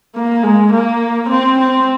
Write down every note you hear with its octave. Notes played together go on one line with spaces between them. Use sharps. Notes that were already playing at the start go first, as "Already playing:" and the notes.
A#3
G#3
A#3
C4
C4